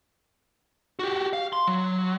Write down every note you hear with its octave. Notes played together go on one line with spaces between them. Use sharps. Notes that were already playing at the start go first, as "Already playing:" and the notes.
F#4 G4
F5
C6
F#3